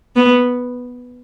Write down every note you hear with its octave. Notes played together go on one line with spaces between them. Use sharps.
B3